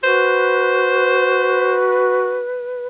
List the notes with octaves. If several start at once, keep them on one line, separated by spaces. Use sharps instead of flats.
F#4 B4 C5